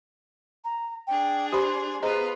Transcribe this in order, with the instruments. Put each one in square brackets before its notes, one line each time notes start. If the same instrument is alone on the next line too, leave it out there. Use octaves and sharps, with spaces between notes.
[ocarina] A#5
[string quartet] D4 G#4 [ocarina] G5
[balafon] G4 C5 B5 [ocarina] C6
[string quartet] B3 F4 B4 [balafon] G#4 C5 D#5 [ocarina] A#5